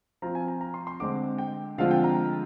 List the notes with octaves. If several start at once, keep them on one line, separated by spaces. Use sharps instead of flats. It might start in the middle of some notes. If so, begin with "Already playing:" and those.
F3 C4 F4 A#5
G#5
A#5
A#5
C6
C6
D3 G#3 C4 D6
G5
D3 F3 G#3 C4 F4 F5
G5
A#5